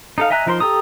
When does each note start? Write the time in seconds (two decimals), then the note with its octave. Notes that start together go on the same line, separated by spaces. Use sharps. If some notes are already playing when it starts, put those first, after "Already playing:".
0.18 D#4 A4 F5
0.30 D#5 E5 G#5 A#5 F#6
0.47 F3 D#4 A#4 C5 C6
0.60 G4 A4 A#5 D#6